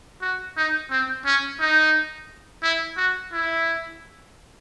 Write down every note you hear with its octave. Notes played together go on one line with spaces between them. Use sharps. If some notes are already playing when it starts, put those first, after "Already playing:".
F#4
D#4
C4
C#4
D#4
E4
F#4
E4